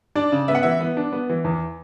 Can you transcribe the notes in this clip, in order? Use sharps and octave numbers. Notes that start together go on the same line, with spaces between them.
D4 D5
C#3
B3 E5
F#5
E3 E5
B3
D4
B3
E3
E2